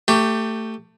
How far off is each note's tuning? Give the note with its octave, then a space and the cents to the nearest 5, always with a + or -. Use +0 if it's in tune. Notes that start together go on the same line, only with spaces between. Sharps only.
A3 +20 G4 +0